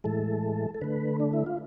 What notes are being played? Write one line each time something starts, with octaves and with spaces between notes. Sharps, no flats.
A2 E3 G#3 A4
A4
D3 A3 B4
D4
E4
F4